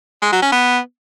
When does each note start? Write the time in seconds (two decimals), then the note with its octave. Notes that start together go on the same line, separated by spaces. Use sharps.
0.22 G#3
0.32 F#3
0.42 C#4
0.52 B3